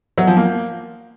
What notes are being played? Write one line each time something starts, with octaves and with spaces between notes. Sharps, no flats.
F#3
F3
A#3